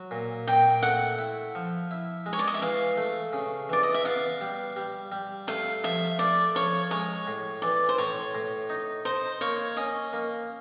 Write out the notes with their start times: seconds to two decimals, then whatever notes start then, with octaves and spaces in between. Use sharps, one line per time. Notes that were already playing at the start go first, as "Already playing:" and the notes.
Already playing: F#3
0.11 A#2
0.47 A#2 G5
0.83 A3 F#5
1.18 E4
1.55 F3
1.91 E4
2.26 G#3
2.33 C#5
2.39 D5
2.48 D#5
2.54 E5
2.62 E3 F5
2.97 A3
3.33 C#3
3.69 E3 D5
3.83 D#5
3.94 E5
4.04 B3 F5
4.41 G3
4.76 G3
5.12 G3
5.48 A3 F5
5.84 F3 E5
6.19 A3 D5
6.55 F3 C#5
6.91 G#3 C#5
7.27 A2
7.62 E3 D5
7.89 C5
7.98 A2 C#5
8.35 A2
8.70 D#4
9.05 D#4 C5
9.41 A#3 C#5
9.77 C#4 D#5
10.13 A#3